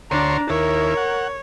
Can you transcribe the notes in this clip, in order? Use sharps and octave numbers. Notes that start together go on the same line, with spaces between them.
D2 D4 C#5 A#5 C6
D#2 E4 A#4 C#5
F#5